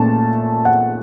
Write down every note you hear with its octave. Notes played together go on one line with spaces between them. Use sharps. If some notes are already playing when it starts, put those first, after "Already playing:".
Already playing: A#2 A3 C#4 A5
F#5